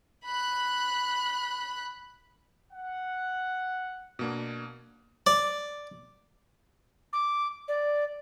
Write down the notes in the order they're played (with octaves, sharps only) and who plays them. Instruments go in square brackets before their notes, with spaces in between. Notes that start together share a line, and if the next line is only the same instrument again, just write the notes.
[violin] B5 F#6
[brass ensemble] F#5
[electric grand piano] B2 A#3 D4
[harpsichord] D5
[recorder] D6
D5